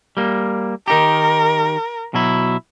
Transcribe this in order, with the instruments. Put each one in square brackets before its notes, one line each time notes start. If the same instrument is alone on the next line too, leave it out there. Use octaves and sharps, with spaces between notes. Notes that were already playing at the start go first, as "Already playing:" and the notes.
[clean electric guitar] G3 A#3
[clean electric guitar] D#3 D#4 G4 [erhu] A#4
[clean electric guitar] B2 F#3 E4